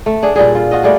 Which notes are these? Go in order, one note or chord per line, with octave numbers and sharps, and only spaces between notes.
A3
D4 G#4
A#2 G3 G#4
F4
F4 F#4 D#5
G3 A3 D4 G#4